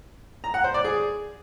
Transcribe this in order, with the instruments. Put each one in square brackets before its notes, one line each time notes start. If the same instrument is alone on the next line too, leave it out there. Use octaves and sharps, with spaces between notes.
[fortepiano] A#5
F#5
C5
D5
G#4